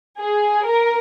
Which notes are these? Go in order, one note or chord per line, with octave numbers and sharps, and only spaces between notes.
G#4
A#4